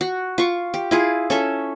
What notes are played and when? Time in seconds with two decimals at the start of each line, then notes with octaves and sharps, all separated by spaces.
0.01 F#4
0.38 F4 C#6
0.74 G4
0.91 E4 F4 G#4
1.30 C#4 A4 E5